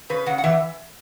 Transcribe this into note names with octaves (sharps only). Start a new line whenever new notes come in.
C#3 B4
C#3 F#5
F#5
E3 E5